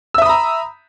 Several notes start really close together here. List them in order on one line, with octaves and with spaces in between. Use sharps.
E6 E5 D#6 B5 A#5